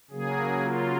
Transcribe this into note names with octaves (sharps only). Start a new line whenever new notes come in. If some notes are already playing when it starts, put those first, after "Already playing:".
C#3 F#3 A#3 G#4
F4